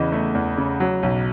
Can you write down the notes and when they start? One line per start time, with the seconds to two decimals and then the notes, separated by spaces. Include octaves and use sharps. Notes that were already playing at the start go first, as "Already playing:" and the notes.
Already playing: E2 C#3 E3 D#5
0.12 A3
0.35 E2
0.57 C#3
0.80 F#3
1.03 B1